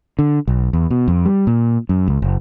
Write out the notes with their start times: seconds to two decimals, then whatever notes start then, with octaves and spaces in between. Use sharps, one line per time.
0.19 D3
0.48 B1
0.73 E2
0.90 B2
1.08 F2
1.26 G3
1.47 A#2
1.89 F#2
2.08 C#2
2.22 F#1